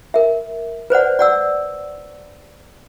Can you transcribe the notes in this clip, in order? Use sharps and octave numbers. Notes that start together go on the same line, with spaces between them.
A#4 E5
B4 C5 D5 F#5
D5 F#5 E6